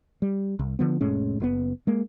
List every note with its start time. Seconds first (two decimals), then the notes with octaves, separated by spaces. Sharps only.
0.22 G3
0.59 C2
0.79 D3 F3 B3
1.01 F1 A2 G#3 C#4
1.40 F#1 A2 B3
1.87 G#3 A#3